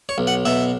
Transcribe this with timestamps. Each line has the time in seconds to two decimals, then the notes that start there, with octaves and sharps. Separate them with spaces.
0.09 C#5
0.18 B1
0.27 F#5
0.45 B2 E5